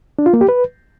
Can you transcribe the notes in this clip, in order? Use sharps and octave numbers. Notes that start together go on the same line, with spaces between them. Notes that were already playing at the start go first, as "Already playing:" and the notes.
D4
F4
A#3
G4
B4